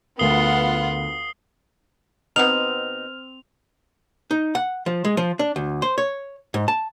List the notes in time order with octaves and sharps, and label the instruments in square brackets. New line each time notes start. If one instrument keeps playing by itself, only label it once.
[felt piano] D2 A#4 [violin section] B3 F4 F#5 [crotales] D#6 C7 G7
[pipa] B2 B3 D#4 [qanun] C4 [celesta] F6 [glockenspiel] F7
[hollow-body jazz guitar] D#4
F#5
F3
G#3
F3
D4
D2
C5
C#5
G#2
A5